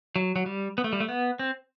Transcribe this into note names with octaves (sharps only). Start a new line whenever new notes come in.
F#3
F#3
G3
B3
A3
G3
A3
B3
C4